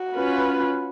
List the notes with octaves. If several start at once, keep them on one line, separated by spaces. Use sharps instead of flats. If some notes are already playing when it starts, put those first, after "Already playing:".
Already playing: F#4
C#4 F4 B4